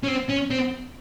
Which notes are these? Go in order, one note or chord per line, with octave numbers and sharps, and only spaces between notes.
C#4
C4
C#4
C4